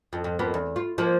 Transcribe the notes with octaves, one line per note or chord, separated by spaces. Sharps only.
F2
F2
F2 A#3 B3
E2
F4
F3 A#3